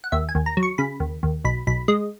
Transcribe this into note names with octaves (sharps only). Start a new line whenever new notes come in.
F#5
D#2 E5
G#5
D#2
A#5
F#3
C#6
C#3 B5
D#2
D#2
B1 B5
B1 B5
G#3 D#5